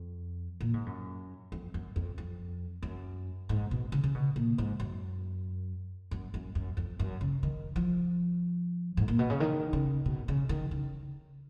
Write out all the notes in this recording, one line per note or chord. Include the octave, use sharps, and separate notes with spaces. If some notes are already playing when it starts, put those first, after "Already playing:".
Already playing: F2
A#2
G#2
F#2
F2
F#2
F2
F2
F#2
G#2
B2
C#3
C#3
B2
A#2
G#2
F#2
F#2
F#2
F#2
F2
F#2
C#3
D#3
F3
G#2
A#2
B2
C#3
D#3
C#3
B2
C#3
D#3
C#3